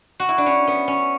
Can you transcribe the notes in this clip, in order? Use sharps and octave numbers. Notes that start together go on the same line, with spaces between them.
F#4
E4
D4
C#4
B3
C#4